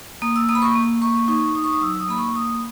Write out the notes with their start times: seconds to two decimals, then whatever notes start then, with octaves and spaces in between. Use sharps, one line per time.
0.22 A#3 D#6
0.36 E6
0.49 A#3 D#6
0.55 B5
0.62 C#6
0.75 A#3
1.02 A#3 C#6
1.28 D#4 C#6
1.55 D#4 D#6
1.64 C#6
1.72 D#6
1.81 F#3 E6
2.00 D#6
2.09 A#3 B5
2.18 C#6
2.35 A#3 D#6